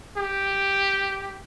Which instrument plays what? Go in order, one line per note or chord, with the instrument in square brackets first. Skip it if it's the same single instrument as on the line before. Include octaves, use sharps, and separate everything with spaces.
[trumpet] G4